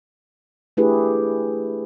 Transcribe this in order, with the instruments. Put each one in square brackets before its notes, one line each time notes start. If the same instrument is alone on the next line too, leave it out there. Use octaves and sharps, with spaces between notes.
[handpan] A3 D4 E4 G4 G#4 B4